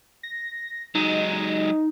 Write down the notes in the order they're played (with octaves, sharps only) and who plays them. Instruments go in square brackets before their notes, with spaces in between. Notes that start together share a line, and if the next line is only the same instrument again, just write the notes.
[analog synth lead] A#6
[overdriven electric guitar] F#3 G#3 [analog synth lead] D#4